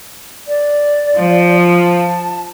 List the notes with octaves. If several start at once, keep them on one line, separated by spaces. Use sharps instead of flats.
D5
F3
A5